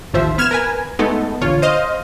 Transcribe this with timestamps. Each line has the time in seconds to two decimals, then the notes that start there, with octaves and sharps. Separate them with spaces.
0.14 A1 D#2 F3 C5 E5
0.38 B3 F6 G#6 E7
0.51 A#4 B4 G#5
0.99 G#3 A3 B3 D#4 A4
1.41 A#1 E2 D3 F4 C#5
1.62 C5 D#5 F5